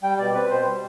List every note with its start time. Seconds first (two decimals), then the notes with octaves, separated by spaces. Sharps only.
0.03 G3 G5
0.19 B2 D5
0.34 C4 B4
0.50 B2 C5
0.66 G3